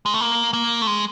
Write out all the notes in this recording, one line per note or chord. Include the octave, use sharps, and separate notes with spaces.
G#3
A3
A#3
A#3
A3
G#3